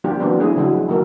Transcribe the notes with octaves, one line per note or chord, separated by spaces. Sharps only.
F3 G3 A#3 D4 F4 G4
E3 F#3 B3 C4 D4
A3 D4 E4 G#4
C#3 F3 F#3 G#3 E4
D#3 F#3 A#3 A4 A#4